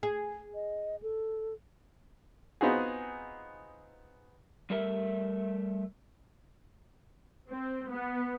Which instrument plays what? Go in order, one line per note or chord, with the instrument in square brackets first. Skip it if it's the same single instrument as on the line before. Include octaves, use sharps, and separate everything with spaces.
[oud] G#4
[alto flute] D#5
A4
[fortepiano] B3 C4 D#4 F4 F#4 G#4
[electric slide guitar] G3 A3 A#4 E5
[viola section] C4
B3